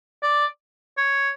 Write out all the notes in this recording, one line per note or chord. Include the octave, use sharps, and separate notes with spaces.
D5
C#5